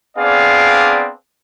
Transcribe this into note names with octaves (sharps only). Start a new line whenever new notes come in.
B3 C4 D4 G#4 D5 F5